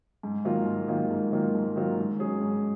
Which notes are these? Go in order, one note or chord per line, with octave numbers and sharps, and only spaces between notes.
G#2
D#3 F#3 A#3 F4
G#2
D#3 F#3 A#3 F4
G#2
D#3 F#3 A#3 F4
G#2
D#3 F#3 A#3 F4
G#2
F#3 C#4 G#4
G#2